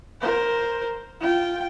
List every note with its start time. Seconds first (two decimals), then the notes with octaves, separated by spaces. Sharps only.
0.21 A#4 C5
1.20 F4 G5